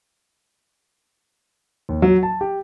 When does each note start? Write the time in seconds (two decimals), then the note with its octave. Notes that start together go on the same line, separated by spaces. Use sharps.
1.89 D#2
2.02 F#3
2.23 A5
2.41 G4